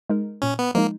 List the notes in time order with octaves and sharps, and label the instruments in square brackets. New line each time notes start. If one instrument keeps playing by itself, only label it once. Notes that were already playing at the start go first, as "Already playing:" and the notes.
[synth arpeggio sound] G#3 D#4 A#4
[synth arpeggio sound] A#2 [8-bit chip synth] C#4
[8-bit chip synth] B3
[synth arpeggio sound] F3 G#3 D#4 [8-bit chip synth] A#3